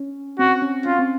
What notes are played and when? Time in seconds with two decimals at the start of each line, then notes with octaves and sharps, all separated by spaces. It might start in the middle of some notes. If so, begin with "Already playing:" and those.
Already playing: C#4
0.39 C4 F#4
0.62 C#4
0.86 C#4 F4
0.99 C4